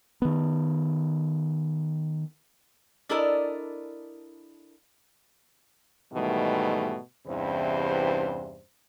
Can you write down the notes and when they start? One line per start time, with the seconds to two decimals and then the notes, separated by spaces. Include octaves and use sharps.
0.22 D#3 B3
3.09 D4 E4 A4 A#4 D5 D#5
6.13 G#2 B2 D#3 E3 G3 A3
7.27 E2 G2 C3 E3 C#4 C5